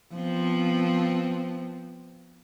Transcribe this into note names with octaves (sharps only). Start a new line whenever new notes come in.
F3 B3 C4